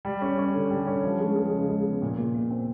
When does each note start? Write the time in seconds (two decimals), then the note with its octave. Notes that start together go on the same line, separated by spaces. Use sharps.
0.05 G3
0.22 C#4
0.38 C#4
0.54 D3
0.70 G3
0.87 C#4
1.03 F3
1.20 G#3
1.36 G#3
1.53 C#3
1.69 G#3
1.86 B3
2.02 A#2
2.18 A#2
2.35 A#2
2.51 C4